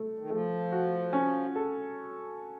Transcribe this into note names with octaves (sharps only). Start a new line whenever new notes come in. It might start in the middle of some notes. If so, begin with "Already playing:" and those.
Already playing: A3
D#3
F3 A3
F#4
C#4
A4